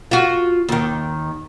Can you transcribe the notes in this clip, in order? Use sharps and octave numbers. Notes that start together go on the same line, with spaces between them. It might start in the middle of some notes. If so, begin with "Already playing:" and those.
F4 F#4
D#2 D#3